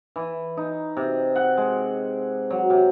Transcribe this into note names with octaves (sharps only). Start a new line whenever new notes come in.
E3
D#4
C3
F#5
G#3
F#3
C3